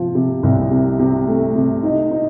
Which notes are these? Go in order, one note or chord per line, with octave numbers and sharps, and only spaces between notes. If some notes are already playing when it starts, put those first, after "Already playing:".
Already playing: C3 F3
C3
C2
C3
C3
A3
C3
D#4
D#4